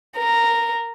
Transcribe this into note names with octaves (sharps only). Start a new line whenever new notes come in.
A#4